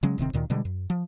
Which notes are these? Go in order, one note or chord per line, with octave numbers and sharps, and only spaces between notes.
C#3 F#3 G#3 C#4
D1 C3 D#3 C4
D2 A#2 D#3
B2 D3 G3 G#3
F#2
F3